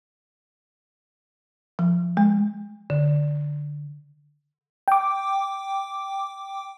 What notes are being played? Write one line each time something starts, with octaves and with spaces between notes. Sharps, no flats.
F3
G#3
D3
G5 D6